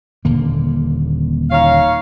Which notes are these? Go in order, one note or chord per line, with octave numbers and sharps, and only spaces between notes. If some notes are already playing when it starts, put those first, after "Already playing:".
D#1 D3 A#3
D#4 C#5 F5